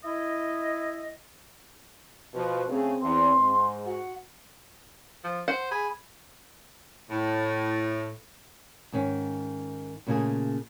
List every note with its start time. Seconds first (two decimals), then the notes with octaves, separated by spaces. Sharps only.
0.04 E4 D#5
2.34 B2 F3 B4
2.70 C#3 A3 C4 G#4
3.01 E2 C6
3.38 G#2
3.86 F#4 F#5
5.24 F3
5.48 C5 F#5
5.71 G#4 B5
7.10 A2
8.92 G#2 D#3 C#4
10.07 A#2 C#3 A3 A#3 G#4